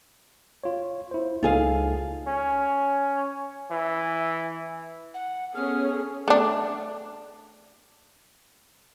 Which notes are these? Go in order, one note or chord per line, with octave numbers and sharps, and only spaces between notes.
F4 C#5
E4 C5
C#2 D#4 F4 G#4 A4 F5
C#4
E3
F#5
B3 C#4 G#4 A4 C#5 F6
A3 D4